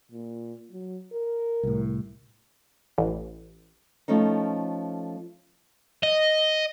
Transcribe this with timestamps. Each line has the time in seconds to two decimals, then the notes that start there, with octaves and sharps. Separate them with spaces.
0.11 A#2
0.72 F#3
1.12 A#4
1.63 C2 A2
2.98 A1
4.08 F3 A3 C#4 D#4
6.03 D#5